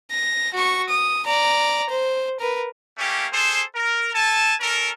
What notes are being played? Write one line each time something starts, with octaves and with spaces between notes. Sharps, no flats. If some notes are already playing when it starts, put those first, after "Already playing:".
A#6
F#4 C#6
D#6
D5 A#5
C5
A#4 B4
A3 A#3 C#4 G4
G#4 A4 C5
A#4
A4 G#5 A5
C#4 A4 A#4